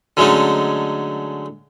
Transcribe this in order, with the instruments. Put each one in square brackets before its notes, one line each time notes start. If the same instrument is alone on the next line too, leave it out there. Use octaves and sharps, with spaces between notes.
[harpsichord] D3 F#3 G#3 A3 C#4 D#4